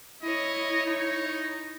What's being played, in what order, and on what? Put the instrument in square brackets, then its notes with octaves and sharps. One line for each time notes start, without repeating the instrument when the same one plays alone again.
[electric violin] E4 C#5 [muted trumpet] D#5
[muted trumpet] D#4